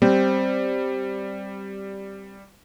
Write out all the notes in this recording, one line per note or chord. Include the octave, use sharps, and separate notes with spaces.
G3 C4